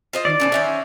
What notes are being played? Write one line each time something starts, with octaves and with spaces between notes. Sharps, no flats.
F4 C5 D#5
D#3 D5
B2 E3 A3 C#4
F#3 C#4 C5 E5